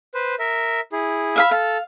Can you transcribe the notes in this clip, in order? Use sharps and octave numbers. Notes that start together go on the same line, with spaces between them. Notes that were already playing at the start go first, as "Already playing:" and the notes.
B4 C5
A#4 E5
E4 G#4
E5 F5 B5
A4 F5